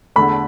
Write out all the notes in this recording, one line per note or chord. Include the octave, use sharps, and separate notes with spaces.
E2 D3 A3 B5